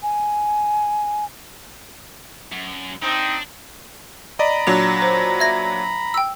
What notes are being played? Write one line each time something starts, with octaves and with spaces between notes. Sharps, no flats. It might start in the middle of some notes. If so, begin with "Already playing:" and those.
G#5
F#2
C4 D4 D#4
D5 D#5 A#5 B5
A#2 F#3 D4 F7
C5
E5 G#6 A#6
G5 E6